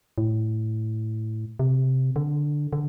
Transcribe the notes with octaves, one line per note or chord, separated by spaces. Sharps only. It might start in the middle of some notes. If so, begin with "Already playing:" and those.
A2
C3
D3
D3